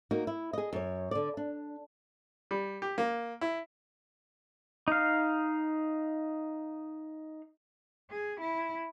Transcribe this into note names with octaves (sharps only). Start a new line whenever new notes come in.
A#3 D#4 F#4
E4
G#4 D#5
F#2 C#5
D3 D5
D4
G3
G4
A#3
E4
D#4 F5
G#4
E4